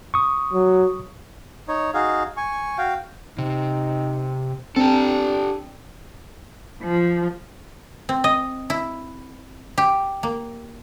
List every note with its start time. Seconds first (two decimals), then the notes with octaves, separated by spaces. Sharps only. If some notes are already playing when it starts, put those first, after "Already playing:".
0.14 C#6 D#6
0.53 F#3
1.68 D#4 C#5
1.94 D#4 F#4 G#4 F5
2.37 G#5 C#6
2.78 F#4 F5 G5
3.38 C3 D#4
4.76 C4 D4 G4 A4
6.83 F3
8.09 C4
8.24 D#5
8.70 E4
9.78 G4
10.23 A#3